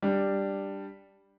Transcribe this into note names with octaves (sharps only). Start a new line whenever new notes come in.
G3 D4